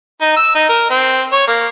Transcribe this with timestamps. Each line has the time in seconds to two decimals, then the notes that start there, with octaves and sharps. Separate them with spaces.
0.21 D#4
0.36 E6
0.55 D#4
0.69 A#4
0.90 C4
1.33 C#5
1.48 A#3